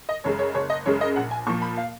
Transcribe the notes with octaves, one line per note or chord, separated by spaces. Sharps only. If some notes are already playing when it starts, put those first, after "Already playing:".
D#5
F#2 C#3 G#3 C#5
C#5
F#1 C#5
D#5
F#2 C#3 G#3 C#5
D#5
A#1 F#5
G#5
A#2 F3 C#6
B5
F5